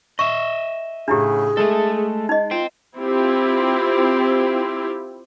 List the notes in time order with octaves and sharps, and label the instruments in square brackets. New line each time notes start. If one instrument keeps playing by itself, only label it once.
[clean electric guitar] D#5 E5 [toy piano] C#6
[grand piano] A2 C#3 [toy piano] D4 E4 G4 [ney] G#4
[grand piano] G#3 [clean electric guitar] A3 A4
[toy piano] D#4 D#5
[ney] F4 [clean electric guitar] C5 G5
[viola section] C4 E4 F4 G4